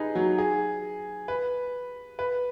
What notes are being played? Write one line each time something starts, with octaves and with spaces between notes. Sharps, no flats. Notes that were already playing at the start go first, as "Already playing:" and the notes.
Already playing: D#4 G#4 B4
F#3
G#4
B4
B4